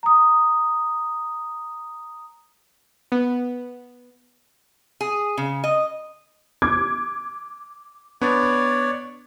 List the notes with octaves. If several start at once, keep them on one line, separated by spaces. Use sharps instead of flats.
A#5 D#6
B3
G#4
C#3
D#5
D6 G#6
B3 D4 C#5 D5